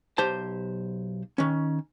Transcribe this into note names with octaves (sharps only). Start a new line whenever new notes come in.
B1 G4 C5 A5
D#3 C#4